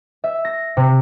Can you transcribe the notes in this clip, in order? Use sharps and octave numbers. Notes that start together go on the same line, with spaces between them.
E5
A#6
C3